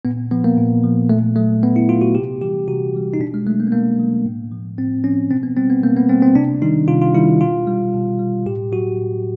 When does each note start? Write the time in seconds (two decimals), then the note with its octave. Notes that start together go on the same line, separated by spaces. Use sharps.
0.05 A#2 B3
0.31 F3 B3
0.44 A#3
0.58 A#2
0.84 F3
1.09 A#2 A3
1.36 F#3 A3
1.63 A#2 B3
1.76 E4
1.89 F#3 F4
2.01 F#4
2.15 C3 G4
2.41 E3 G3 G4
2.68 C3 F#4
2.94 E3 G3
3.14 D#4
3.20 B2 D4
3.34 G#3
3.47 F#3 A3
3.60 A#3
3.67 B3
3.72 B2 A#3
3.99 F#3
4.25 A2
4.52 F3
4.78 A2 C4
5.04 F3 C#4
5.30 B2 C4
5.43 B3
5.56 G3 C4
5.70 B3
5.84 B2 A#3
5.96 B3
6.09 G3 C4
6.22 C4
6.35 C3 D4
6.62 D#3 G3 D#4
6.88 C3 F4
7.01 F4
7.15 D#3 G3 E4
7.41 B2 F4
7.67 G3
7.94 B2
8.19 G3
8.46 A2 G4
8.72 F#3 F#4
8.99 A2